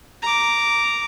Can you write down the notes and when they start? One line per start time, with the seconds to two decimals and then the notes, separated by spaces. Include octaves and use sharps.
0.22 A#5 D6